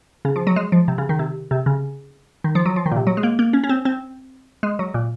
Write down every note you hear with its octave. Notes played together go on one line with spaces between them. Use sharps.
C#3
F3
F#3
G#3
F3
C3
C#3
D#3
C3
C3
C#3
D#3
F3
F#3
F3
D#3
A#2
C3
F#3
G#3
A#3
A#3
C#4
C#4
C4
C4
G#3
F#3
A#2